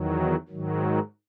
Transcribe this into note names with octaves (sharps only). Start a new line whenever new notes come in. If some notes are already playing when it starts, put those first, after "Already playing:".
Already playing: E2 D#3 F#3
G#2 D#3 F#3